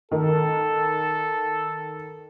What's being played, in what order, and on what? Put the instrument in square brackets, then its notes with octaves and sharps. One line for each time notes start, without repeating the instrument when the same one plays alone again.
[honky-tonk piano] D#3 [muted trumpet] A4